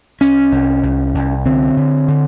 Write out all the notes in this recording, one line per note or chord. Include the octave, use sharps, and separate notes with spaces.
C2 C#4
C2
C2
C2
D3 C4
D3
D3